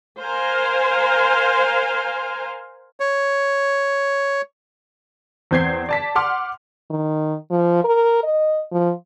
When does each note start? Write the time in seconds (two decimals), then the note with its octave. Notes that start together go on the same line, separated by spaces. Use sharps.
0.21 A#4 C5 F5 G#5
3.00 C#5
5.51 E2 C4 G6 G#6 C7
5.89 D5 A5 B6
6.15 F#5 C6 D6 F6
6.91 D#3
7.51 F3
7.84 A#4
8.23 D#5
8.72 F3